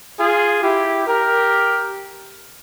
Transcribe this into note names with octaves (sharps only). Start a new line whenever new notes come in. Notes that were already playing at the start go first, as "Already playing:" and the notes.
F4 G#4
E4 G4
G4 A#4